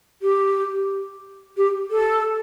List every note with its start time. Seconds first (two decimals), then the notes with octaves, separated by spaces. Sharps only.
0.22 G4
1.57 G4
1.91 A4